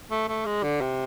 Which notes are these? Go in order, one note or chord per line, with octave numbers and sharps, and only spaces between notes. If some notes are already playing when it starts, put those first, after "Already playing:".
A3
A3
G#3
D3
C3